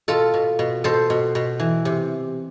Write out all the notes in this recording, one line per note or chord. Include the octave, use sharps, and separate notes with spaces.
B2 F4 A4
B2
B2
B2 A4 C5
B2
B2
E3
C3